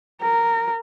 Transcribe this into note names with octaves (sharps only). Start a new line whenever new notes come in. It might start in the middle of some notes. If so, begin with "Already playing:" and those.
A#4